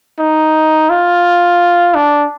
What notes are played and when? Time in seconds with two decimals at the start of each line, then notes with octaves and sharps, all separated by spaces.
0.19 D#4
0.90 F4
1.95 D4